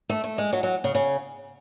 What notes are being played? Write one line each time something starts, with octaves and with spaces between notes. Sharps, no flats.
A3
A3
G#3
F#3
F#3
C#3
C#3